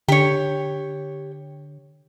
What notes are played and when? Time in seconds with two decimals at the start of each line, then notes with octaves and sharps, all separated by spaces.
0.08 D3 G4 C#5